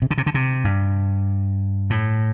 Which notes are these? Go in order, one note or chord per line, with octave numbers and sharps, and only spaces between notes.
C3
D3
C3
D3
C3
G2
A2